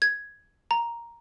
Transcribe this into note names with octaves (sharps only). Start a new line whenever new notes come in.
G#6
A#5